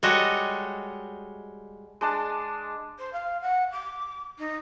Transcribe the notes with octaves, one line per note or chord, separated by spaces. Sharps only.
G3 G#3 F#4 A4 C#5 D#5
G#3 D4 A5
C5
F5
F#5
D6
D#4